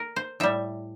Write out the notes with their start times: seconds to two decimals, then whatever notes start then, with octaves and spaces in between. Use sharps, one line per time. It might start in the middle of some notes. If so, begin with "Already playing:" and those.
Already playing: A#4
0.16 C5
0.40 A2 G3 E5